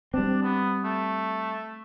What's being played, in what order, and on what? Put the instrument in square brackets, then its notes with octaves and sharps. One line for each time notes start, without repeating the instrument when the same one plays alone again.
[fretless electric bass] G3 C4 [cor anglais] D4
[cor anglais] B3
A3